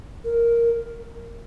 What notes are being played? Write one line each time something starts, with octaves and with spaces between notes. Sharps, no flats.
A#4